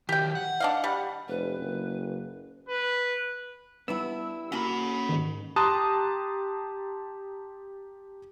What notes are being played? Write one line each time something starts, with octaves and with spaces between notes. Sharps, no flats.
D#3 F#3 G4 G5
F#5
D4 D#5 F5
G3
F1 B4
F#1
B4
G3 B3 D4 E4 E6
A#3 C#4 F#4 F#5 B5
G#2 D#3
G4 A5 A#5 C6 D#6 F#6